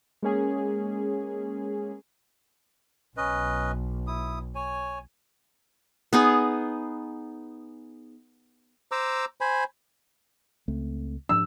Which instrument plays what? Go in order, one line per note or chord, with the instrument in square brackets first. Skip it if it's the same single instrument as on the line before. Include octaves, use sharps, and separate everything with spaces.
[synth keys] G#3 A#3 C#4 G#4
[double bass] B1 [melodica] C#4 B4 D#5
[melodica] E4 D#6
C#5 G#5
[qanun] B3 D#4 G#4
[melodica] C5 A#5 D6 E6
C5 G#5 B5
[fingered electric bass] C#2 A3 C4
[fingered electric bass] G#2 F3 D4 [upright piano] E6